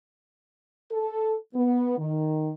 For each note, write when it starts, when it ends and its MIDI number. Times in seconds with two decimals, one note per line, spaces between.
0.92 1.35 69
1.55 1.97 59
1.98 2.51 51